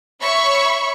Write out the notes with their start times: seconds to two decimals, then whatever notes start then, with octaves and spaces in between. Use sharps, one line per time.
0.21 C#5 E5 B5 C#6